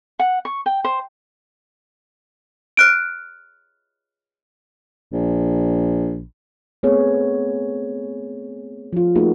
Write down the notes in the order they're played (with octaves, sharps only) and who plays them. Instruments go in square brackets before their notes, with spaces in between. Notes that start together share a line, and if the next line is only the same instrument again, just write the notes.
[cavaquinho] F#5
C#6
G5
C5
[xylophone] F6 F#6 D7
[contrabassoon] A#1
[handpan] A3 B3 C4 G#4 C#5
F3 F4
A3 A#3 D#4 F#4 G#4